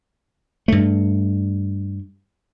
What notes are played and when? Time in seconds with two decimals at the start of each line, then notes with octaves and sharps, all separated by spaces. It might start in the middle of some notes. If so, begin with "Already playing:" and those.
0.68 G2 A3